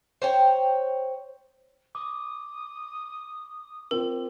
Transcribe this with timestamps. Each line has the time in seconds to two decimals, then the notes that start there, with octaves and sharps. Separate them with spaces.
0.22 C5 C#5 G5
1.95 D6 D#6
3.91 C4 F4 A#4